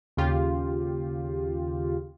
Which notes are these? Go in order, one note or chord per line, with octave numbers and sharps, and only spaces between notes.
D#2 C#3 F4 G4